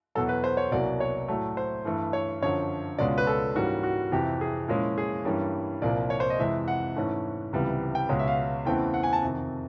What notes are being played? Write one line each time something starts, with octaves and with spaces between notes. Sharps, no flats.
E2 B2 F#3 A4
B4
C5
C#5
C2 B2 F#3 A#3 D5
C#5
A2 F#3 A3
C5
G2 E3 A3
C#5
F#2 D3 F3 C#5
C#2 B2 G#3 C#4 F4 D5
B4
A4
G#2 E3 G3 A#3 C#4 F#4
F#4
F2 C3 E3 G4
G#4
A#2 F3 G#3 C#4 E4
G#4
G2 E3 G3 A#3 C#4
C2 A#2 F3 A#3 D5
C#5
C5
D#5
F2 C3 E3 G#3 E5
F#5
G#2 E3 A3 C#4
C#2 C3 E3 G3 B3
G5
C#2 B2 G#3 C#4
E5
F5
E2 C#3 E3 A3 C4 G5
F#5
G#5
A5
F2 C3 D#3